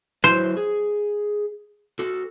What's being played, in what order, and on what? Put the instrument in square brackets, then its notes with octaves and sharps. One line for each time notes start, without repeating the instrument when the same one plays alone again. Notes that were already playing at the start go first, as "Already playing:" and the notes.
[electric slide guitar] F#3 E4 B4 [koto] C5
[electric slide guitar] G#4
F#4 A4